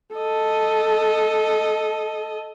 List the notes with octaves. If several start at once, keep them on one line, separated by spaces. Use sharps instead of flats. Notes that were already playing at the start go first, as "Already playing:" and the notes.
A4 D#5